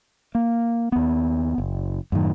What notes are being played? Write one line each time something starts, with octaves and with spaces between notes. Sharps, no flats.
A#3
D#2 B3
F#1
F#2 A2 D#3